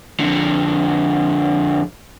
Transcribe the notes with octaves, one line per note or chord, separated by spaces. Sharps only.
F2 D3